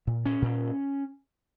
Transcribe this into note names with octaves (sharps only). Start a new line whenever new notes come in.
A#2
C#4
A#2